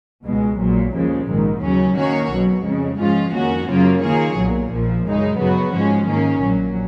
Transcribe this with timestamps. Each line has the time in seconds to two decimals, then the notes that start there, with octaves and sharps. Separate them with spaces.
0.25 C#2 B2 G#3
0.59 A#1 A#2 F#3
0.94 D#2 C#3 F3 G#3
1.27 A#1 G#2 D#3
1.62 D#2 C#3 F#3 C#4
1.96 D#3 A#3 C#4 F#4 C#5
2.31 B1 B2 F#3
2.64 F2 C#3 G#3
2.99 G#2 F3 G#3 C#4 F4
3.34 F2 D#3 A#3 C#4 F#4
3.68 F#2 C#3 F#3 A#3 F4
4.02 D#3 A#3 F4 G#4 C#5
4.36 B1 A#2 F#3
4.71 A#1 A#2 F3
5.06 F#2 C#3 G#3 D#4
5.39 F#2 C#3 F#3 B3 F#4
5.73 G#2 F3 G#3 C#4
6.08 G#2 D#3 A#3 C#4
6.43 A#1 A#2 F#3